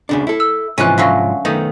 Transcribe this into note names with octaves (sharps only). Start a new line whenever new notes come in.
D2 C#3 D4
E4 A4
E6
G#2 C3 E3 F3 C#4 F#6 D#7
D3 F#3 C#4 E5 F5 A#6
D#3 A3 B3 D#4